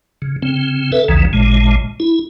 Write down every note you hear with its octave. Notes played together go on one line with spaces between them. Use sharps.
C#3
C#3 C4
A4 B4 E5
A#1 D#2 C#3 E3
A1 A#2 G#3
E4